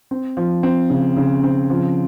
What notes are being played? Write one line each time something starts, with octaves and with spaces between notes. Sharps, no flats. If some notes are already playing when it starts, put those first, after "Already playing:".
C4
F3
C4
C#3
C#3
C4
F3